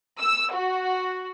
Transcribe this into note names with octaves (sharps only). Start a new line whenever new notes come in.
E6
F#4